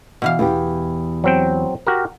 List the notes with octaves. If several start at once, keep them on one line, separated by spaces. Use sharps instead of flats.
B2 E3 F5
E2 G4
F#3 C4 G5
F#4 G4 A#4